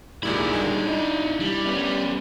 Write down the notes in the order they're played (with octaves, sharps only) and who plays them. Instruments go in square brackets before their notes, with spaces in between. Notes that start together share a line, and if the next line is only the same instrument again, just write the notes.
[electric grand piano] D2 A#2 G3 [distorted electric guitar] D#4 B5 [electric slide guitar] E4 G#4
[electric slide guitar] A#2 G3 A#3 [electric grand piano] G#3 D4
[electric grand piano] D4 [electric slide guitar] E4 D#5
[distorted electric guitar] G3
[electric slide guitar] B3 C#4 B4